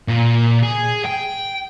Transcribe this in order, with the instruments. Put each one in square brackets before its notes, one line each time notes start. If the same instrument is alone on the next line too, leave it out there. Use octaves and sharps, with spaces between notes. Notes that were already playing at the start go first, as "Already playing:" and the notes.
[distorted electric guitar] A#2
G#4
G5